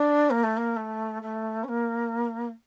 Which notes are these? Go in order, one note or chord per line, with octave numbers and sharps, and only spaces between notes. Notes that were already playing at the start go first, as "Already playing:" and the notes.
Already playing: D4
A#3
A3
A#3
A3
A3
C#4
A#3